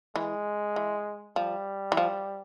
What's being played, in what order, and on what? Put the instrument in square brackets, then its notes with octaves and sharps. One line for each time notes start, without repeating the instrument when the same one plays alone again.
[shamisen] E3 [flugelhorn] G#3
[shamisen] E3
[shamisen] F3 [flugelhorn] G3
[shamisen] E3
F3